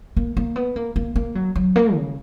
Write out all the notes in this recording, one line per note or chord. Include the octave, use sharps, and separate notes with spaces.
A#3
A#3
B3
A#3
A#3
A#3
F#3
F#3
A#3
C#3